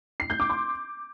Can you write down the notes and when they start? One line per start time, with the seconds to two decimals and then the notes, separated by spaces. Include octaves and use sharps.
0.20 C7
0.30 G6
0.40 D6
0.50 C6